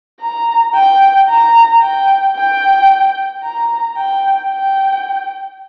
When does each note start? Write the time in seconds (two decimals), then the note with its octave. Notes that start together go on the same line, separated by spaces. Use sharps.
0.21 A#5
0.74 G5
1.28 A#5
1.82 G5
2.35 G5
3.43 A#5
3.97 G5
4.51 G5